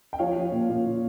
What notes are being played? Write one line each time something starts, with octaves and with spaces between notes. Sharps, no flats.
G5
F3 C#5 F5
F3
A#2
A#2
A#2